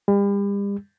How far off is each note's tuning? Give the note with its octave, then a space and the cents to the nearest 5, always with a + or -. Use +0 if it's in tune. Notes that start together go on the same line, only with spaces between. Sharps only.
G3 +40